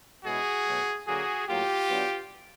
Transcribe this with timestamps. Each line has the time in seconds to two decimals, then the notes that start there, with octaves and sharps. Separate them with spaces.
0.24 B2 G#3 C#4 E4 F#4 G#4
0.65 B2 F#3 A3
1.06 D3 F#3 A#3 F#4 G#4
1.47 A2 F#3 A#3 F4 G4
1.88 F#3 B3 D4